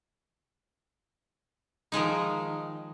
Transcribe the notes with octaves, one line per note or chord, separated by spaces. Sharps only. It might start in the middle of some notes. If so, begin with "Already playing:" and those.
D#3 F3 G#3 D#4